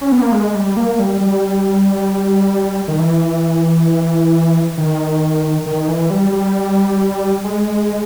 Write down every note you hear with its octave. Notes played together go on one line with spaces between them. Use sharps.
C#4
B3
A#3
G#3
G3
A#3
G3
G3
D#3
E3
D#3
D#3
E3
G3
G3
G#3